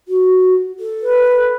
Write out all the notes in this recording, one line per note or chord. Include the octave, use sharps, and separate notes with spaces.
F#4
A4
B4